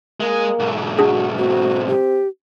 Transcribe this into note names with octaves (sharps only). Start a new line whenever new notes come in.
G#3 A#3 G#4
B1 G#2
D4 F#4 G#4
C4 F#4
G4